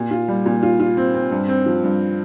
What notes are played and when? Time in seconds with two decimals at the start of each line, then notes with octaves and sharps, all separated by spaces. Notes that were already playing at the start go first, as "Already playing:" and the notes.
Already playing: A#2
0.11 F4
0.28 G3
0.46 A#2
0.63 F4
0.80 F4
0.97 C4
1.14 C4
1.31 G2
1.48 C4
1.66 F3
1.84 G2